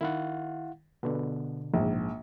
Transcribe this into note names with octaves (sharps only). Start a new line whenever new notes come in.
D#3 E4 F5 F#5
B2 D3 B3
A#1 G#2